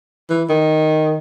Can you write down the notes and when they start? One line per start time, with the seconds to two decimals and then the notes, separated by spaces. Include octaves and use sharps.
0.30 E3
0.49 D#3